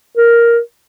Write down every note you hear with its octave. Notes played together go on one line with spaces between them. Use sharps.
A#4